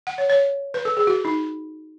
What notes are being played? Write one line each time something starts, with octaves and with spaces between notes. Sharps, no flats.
F#5
C#5
C#5
B4
A4
G#4
F#4
D#4